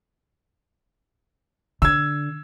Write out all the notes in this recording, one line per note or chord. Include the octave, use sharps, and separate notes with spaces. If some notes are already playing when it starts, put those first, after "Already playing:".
D3 E6 G#6